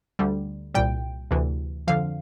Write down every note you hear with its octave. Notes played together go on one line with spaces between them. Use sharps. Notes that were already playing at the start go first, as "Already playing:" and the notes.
D2 D3 G3
C2 A#2 G3 G5
D2 C3 E3
F2 D3 F3 F5